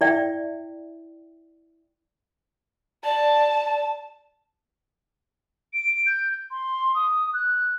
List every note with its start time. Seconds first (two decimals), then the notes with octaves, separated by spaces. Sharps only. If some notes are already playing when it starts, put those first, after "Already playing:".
0.01 E4 D5 E5 G5
3.04 D5 A5
5.73 D7
6.06 G6
6.51 C6
6.95 D#6
7.33 F#6